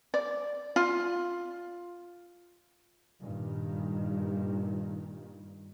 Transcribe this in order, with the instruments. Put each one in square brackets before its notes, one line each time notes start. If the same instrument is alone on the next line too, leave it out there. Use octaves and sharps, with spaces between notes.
[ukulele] D5
F4
[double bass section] G2 A#2 D#3